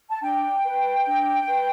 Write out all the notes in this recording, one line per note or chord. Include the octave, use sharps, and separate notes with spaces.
A5
D4 G5
B4
D4
B4